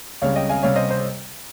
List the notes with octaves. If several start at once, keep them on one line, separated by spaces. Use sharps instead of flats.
C#2 C#3 G3 C#5 F5
D#5 G5
F5 G#5
C3 G3 C#4 C#5 F5
C5 D#5
C5